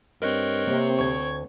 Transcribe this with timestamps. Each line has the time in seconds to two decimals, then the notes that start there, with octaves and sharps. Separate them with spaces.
0.22 G2 C4 A#4 C#5 D#5 F#6
0.67 C3 A#3
0.99 D2 C#6 G#6